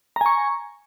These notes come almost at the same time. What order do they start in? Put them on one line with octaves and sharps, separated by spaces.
A#5 G#5 C#6